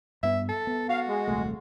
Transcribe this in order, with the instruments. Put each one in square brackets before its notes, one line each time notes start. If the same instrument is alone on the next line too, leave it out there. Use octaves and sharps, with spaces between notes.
[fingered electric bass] G2 B3 [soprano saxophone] E5
[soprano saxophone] A4
[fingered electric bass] B3
[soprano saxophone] F#4 [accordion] F5
[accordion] G#3
[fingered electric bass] D#1 C2 A3